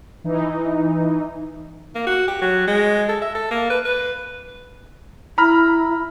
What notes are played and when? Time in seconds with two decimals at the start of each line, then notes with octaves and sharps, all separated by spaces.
0.24 E3 D#4
1.95 A#3
2.07 F#4
2.28 G4
2.41 F#3
2.67 G#3
3.09 A4
3.22 E5
3.35 A4
3.51 A#3
3.70 B4
3.85 B4
5.38 E4 A#5 B5 F6